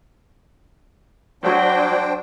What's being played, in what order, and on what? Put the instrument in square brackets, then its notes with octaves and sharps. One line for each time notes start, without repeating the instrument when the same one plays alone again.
[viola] F#3 [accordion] D4 C5 G5